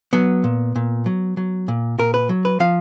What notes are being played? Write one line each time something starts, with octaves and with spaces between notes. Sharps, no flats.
F#3 B3
A#2
A#2
F#3
F#3
A#2
A#2 A#4
B4
F#3
B4
F3 F5